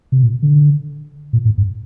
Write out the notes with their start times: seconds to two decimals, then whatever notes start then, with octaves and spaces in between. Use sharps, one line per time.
0.12 C3
0.23 A#2
0.43 D3
1.33 A#2
1.45 A2
1.58 G2